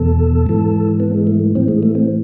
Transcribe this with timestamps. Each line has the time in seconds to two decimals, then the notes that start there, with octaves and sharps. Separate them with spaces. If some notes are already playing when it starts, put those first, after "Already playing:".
Already playing: E2 B2 A4
0.46 G#2 E3
1.00 B3
1.14 G#3
1.27 A3
1.55 A2 E3 C4
1.68 G#3
1.83 A3
1.95 C4